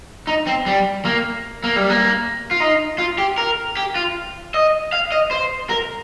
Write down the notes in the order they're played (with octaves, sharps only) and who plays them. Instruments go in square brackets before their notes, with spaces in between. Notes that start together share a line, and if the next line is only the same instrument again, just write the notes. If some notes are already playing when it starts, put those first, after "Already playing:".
[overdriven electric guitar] D#4
C4
G3
A#3
A#3
G3
A#3
F4
D#4
F4
G4
A#4
G4
F4
D#5
F5
D#5
C5
A#4